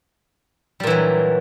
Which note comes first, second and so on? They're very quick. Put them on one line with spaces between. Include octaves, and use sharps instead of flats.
G3 A#2 E3 F#3